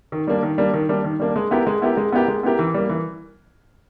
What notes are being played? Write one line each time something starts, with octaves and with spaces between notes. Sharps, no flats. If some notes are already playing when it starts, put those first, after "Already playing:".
D#3
G3 A#3 D4
D#3
G3 A#3 D4
D#3
G3 A#3 D4
D#3
G3 A#3 D4
G#3
B3 E4 G4 A#4
G#3
B3 E4 G4 A#4
G#3
B3 E4 G4 A#4
G#3
B3 E4 G4 A#4
E3
G3 A#3
E3